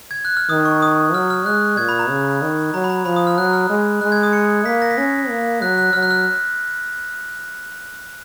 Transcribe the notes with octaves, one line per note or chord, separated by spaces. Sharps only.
G#6
F#6
F6
D#3 D#6
C#6
D#6
F#3 F6
F6
G#3 F#6
A#2 G#6
B5
A#5
C#3
D#3
F#3 A#5
B5
A#5
F3 B5
D#6
F6
F#3 F#6
F6
G#3
G#3 F#6
G#6
D#6
C#7
A#3 B6
A#6
B6
C#4 A#6
A#3
F#3 F#6
F#6
F#3 F6
F#6
F6